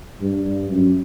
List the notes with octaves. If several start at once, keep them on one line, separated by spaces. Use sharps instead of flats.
G2
F#2